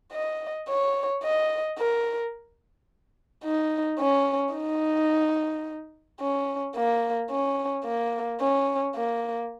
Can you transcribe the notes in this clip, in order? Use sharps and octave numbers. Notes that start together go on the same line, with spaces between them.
D#5
C#5
D#5
A#4
D#4
C#4
D#4
C#4
A#3
C#4
A#3
C#4
A#3